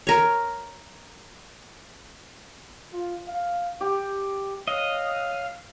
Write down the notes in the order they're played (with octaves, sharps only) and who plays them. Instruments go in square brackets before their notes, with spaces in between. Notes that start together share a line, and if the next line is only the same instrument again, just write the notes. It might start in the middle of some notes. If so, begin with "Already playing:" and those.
[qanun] A#4 C#5
[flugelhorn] F4
F5
[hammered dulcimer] G4
[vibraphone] C#5 [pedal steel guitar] D#5 [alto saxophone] F5